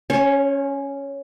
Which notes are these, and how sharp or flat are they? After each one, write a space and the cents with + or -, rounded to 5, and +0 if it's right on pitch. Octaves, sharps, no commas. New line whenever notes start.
C#4 +5 C#5 -45